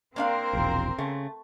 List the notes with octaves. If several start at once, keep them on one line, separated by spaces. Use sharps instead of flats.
A#3 C4 D4 A#4 C5 F5
E1 A#1
C#3 A3